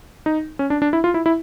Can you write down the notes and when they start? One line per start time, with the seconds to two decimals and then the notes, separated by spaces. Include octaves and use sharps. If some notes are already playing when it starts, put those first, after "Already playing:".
0.26 D#4
0.59 C#4
0.70 D4
0.82 D4
0.93 E4
1.04 F4
1.14 E4
1.26 E4